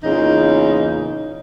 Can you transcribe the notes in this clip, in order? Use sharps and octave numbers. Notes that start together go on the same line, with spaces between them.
E2 A#2 C#3 E3 D#4 D#5